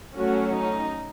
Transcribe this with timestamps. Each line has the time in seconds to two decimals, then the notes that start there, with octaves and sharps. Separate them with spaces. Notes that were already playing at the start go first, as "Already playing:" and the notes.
0.15 F#3 A3 C#4 F#4
0.53 D#4